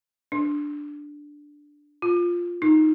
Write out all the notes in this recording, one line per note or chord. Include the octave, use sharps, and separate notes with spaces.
D4
F4
D#4